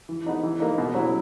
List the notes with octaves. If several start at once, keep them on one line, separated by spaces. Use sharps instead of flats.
E3
B3 D#4
E3
A#3 D#4
B2
F#3 C#4 E4